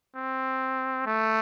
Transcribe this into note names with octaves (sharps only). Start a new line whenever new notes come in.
C4
A3